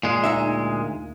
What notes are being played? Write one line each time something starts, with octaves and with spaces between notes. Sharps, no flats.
A#2 G#3
D2 D#4 E5